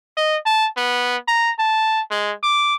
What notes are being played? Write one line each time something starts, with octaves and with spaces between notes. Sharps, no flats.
D#5
A5
B3
A#5
A5
G#3
D6